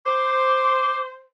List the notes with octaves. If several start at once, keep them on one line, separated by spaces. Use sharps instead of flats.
C5 D6